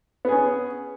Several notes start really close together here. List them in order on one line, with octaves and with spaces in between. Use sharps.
B3 G#4 C#4